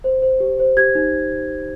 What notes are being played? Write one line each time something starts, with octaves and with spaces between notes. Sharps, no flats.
C5
C5
G4
C5
G4 G#6
D#4